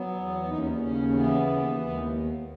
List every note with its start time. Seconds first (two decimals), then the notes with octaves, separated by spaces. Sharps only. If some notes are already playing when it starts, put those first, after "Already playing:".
Already playing: F#3 B3
0.14 E2
0.47 D#2 D#4
0.58 C#4
0.67 B3
0.77 C#3 C#4
1.09 C#4
1.14 E3 B3
1.47 D#2
1.81 D#2 B3
1.90 G#3